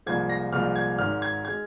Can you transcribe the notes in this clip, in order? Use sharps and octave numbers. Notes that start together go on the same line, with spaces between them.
C2 A#2 F3 G#3 G#6
A#6
C2 A#2 F3 G#3 F6
G#6
G#1 G#2 G#3 F6
G#6
G#3 G#6